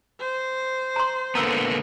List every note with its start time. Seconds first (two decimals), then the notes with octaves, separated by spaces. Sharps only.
0.20 C5
0.96 A#5 C6
1.35 D3 A#3 B3 A#5 E6